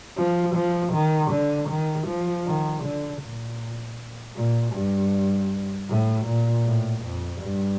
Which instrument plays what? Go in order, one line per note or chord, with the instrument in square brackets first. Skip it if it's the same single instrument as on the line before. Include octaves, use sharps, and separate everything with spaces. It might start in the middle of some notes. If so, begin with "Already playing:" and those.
[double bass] F3
F3
D#3
D3
D#3
F3
D#3
D3
A#2
A#2
G2
A2
A#2
A2
F2
G2